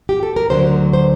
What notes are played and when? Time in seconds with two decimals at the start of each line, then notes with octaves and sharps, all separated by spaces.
0.09 G4
0.23 A4
0.36 A#4
0.50 D2 D3 F#3 C5
0.93 C5